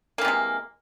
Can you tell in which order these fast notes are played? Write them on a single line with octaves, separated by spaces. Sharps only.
A#3 E3 C3 G#3